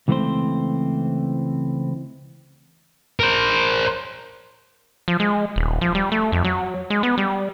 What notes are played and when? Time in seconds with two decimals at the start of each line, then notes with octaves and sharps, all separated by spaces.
0.08 C#2 E3 A3 A#3 C4 C5
3.20 A#4 C5
5.08 F3
5.20 G#3
5.56 D#1
5.81 F3
5.95 G3
6.12 A3
6.32 F2
6.45 F#3
6.90 G#3
7.03 B3
7.18 G3